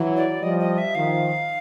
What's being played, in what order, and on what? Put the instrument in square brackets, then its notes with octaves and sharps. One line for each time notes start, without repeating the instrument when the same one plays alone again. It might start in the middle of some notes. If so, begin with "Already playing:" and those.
Already playing: [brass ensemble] E3 F#3
[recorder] D5
[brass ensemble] F3 G3 [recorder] D#5
[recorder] D#5
E5
[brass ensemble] D#3 F3 [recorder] F5